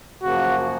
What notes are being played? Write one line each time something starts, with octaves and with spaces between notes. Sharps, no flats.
F#2 C#3 F3 A#3 F#4